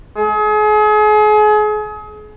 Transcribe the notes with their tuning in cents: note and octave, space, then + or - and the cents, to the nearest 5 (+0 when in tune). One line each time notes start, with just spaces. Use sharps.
G#4 +35